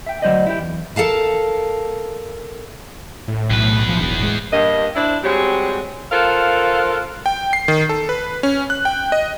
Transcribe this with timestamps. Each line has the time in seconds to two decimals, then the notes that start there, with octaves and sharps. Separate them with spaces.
0.06 E5 G5
0.22 D2 F#3 D#4 C5 D5 D#5
0.47 E4 G4
0.58 E2
0.96 A4 A#4 F5 A5
3.28 A2
3.51 B1 E2 B4
3.88 F3
4.00 E1
4.19 A2 G#3
4.52 G2 A#3 D#5
4.95 D4 E4 C5
5.24 G3 G#3 C4 F#4 G4 C#5
6.12 F4 A4 A#4 C5 F5 F#5
7.26 G5
7.53 C7
7.68 D#3
7.89 A4
8.09 B4
8.43 C#4
8.70 F#6
8.85 G5
9.12 D#5